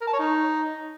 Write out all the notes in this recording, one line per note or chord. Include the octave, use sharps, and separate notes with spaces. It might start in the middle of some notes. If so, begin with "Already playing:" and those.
A#4
A5
C#5
D#4